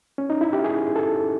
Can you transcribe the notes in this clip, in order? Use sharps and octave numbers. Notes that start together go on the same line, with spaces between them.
C#4
D#4
E4
G4
G#4
A4